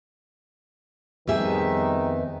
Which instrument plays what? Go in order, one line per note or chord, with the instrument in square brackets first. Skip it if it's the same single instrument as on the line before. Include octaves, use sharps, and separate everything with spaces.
[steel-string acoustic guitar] F2 B3 E5 [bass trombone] D#3 [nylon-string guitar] G3 G4 G#4